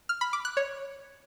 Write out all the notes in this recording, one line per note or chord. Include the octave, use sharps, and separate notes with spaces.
F6
B5
D6
F#6
C#5